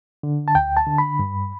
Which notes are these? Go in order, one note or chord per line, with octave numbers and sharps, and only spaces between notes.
D3
A5
D2 G5
A5
D3
B5
G2